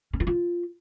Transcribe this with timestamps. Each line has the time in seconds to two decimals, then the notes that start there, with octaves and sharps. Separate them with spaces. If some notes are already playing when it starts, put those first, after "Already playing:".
0.13 C#4
0.20 E4
0.27 F4